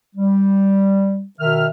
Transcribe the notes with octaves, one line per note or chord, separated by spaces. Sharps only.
G3
B2 D#3 E5 F6